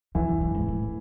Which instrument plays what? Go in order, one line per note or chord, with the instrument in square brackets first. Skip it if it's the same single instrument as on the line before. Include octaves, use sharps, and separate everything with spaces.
[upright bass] E2 [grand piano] E3
[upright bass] F2
F#2
G#2
A2